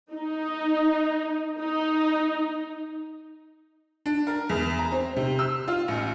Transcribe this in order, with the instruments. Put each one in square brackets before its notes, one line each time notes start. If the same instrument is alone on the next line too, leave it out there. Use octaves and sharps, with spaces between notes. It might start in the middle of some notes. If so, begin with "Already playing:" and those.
[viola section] D#4
D#4
[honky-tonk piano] D4
A#4
E2
A#5
C4
C3
E6
F4
A1